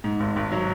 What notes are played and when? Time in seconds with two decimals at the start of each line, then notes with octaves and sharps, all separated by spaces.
0.04 G#2
0.20 G#1
0.36 G#1
0.52 F#3